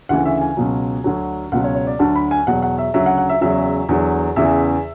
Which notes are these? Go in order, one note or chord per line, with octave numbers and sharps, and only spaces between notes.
D2 C#3 E3 F#5
E5
G#5
C#2 B2 F#3
D2 D3 F#3
C#2 B2 F#3 F#5
C#5
C#5
D5
D2 D3 F#3 A5
B5
G#5
E2 B2 F#3 F#5
F#5
E5
D2 C#3 F#3 E5
F#5
F#5
E5
E2 C#3 F#3 E5
E2 D3 F#3
E2 C#3 E3 E5